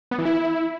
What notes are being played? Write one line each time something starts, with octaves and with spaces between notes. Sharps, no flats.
B3
E3
E4